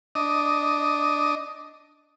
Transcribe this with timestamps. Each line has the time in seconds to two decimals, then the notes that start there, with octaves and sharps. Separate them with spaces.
0.15 D4 D#5